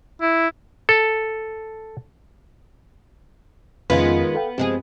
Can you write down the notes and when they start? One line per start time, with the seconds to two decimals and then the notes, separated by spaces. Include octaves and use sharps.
0.21 E4
0.89 A4
3.90 F2 D#3 G#3 B3 C#4 F4 F5
4.35 A4 F5 G5
4.58 G2 F3 G#3 C4 G4 G#4